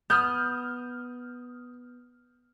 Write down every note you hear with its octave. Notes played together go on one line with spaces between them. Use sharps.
B3 D#6 F6 G6